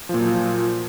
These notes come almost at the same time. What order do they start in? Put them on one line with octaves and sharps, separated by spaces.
F3 A#2 F#3